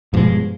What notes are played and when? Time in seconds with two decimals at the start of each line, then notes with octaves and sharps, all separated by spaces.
0.13 G2 B2 F3 G#3